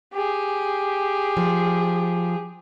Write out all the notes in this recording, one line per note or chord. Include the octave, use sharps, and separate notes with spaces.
G4 G#4
F3